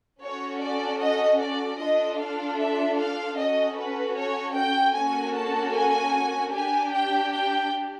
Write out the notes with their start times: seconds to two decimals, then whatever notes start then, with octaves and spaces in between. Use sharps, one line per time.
0.23 C#4 F#4 A4 C#5
0.62 D5
1.02 D#5
1.41 D5
1.80 D4 F4 A4 D#5
2.20 F5
2.59 E5
2.98 F5
3.38 C#4 F#4 A4 D#5
3.78 B4
4.16 C#5
4.56 G5
4.95 A#3 C#4 F#4 A4 G#5
5.35 A5
5.74 G#5
6.53 D4 G4 G#5
6.93 G5
7.32 G5